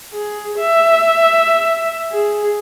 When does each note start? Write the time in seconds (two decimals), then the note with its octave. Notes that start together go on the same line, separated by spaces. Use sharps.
0.13 G#4
0.59 E5
2.12 G#4